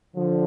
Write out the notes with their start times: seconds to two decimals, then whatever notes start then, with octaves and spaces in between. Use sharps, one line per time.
0.16 D3 F3